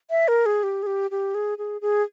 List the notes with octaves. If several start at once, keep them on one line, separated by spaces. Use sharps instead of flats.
E5
A#4
G#4
G4
G#4
G4
G4
G#4
G#4
G#4